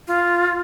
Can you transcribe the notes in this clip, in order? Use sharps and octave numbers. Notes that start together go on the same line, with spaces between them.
F4